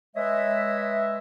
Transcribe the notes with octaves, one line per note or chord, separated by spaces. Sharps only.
G#3 B4 C#5 D#5 E5